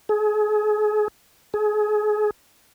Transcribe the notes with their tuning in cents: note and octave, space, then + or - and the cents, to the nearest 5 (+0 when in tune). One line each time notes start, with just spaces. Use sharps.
G#4 +35
G#4 +30